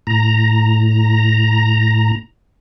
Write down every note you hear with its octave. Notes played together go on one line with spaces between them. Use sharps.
A2 A#5